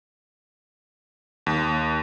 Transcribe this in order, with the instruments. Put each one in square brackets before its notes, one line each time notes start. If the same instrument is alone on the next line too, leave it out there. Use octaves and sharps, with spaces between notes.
[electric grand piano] D#2